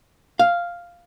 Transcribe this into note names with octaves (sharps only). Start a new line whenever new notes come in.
F5